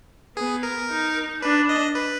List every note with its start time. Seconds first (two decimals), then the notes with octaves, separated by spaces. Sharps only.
0.37 B3 G#4
0.63 A#4
0.90 D#4
1.42 D4 B4
1.69 D#5
1.95 B4